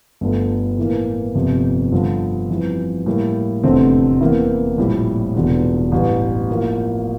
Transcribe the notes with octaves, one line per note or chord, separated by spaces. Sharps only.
G1 G2 D3 F3 A3
A2 E3 A#3
G1 F2 C3
G2 D3 F3
F2 E3 G3
A2 G3 A#3
F1 E2 D3 A3 C4
E2 E3 A#3 E4
A#1 A2 G3
E1 E2 D3
A1 G2 E3
A2 F3 A#3